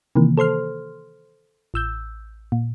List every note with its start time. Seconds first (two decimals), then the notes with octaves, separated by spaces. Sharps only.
0.16 C3 D#3 E3 A#3
0.38 A4 C5 C6 F6
1.74 A1 E6 G6
2.52 A#2